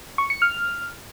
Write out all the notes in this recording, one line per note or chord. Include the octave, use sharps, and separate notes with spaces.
C#6
C#7
F6